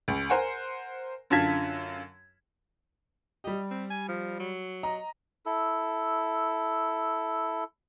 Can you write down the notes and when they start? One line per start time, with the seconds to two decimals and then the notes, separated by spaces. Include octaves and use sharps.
0.08 C#2
0.30 A#4 C5 F#5 G#5
1.30 F#2 D3 F4 A5 G#6 B6
3.44 G3 G4 D#5
3.71 C4
3.90 G#5
4.09 F3
4.39 F#3
4.83 D#5 A#5
5.46 E4 A4